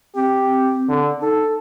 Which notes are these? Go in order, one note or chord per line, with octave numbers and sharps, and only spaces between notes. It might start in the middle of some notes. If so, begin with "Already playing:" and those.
C4 G4
D3
D#4 A4